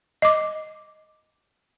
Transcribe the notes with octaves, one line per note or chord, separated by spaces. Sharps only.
D#5 D6